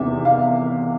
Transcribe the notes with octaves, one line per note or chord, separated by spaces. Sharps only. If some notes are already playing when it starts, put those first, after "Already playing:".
Already playing: E2 C3 D#3 E5
F5